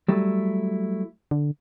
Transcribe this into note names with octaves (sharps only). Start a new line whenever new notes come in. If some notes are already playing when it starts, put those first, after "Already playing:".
F#3 G3 A3 E4
D3